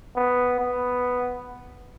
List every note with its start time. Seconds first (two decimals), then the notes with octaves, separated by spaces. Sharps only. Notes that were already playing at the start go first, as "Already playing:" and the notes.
0.16 B3
0.59 B3